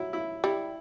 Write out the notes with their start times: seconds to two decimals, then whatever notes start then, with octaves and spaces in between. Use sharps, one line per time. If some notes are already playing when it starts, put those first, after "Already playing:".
Already playing: F#3 E4
0.13 E4
0.44 G3 E4